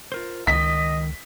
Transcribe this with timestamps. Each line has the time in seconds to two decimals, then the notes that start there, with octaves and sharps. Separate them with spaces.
0.12 F4 A#4 C5
0.47 C#2 D#3 D#5 B6